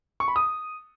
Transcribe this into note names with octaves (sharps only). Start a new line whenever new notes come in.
C#6
B5
D#6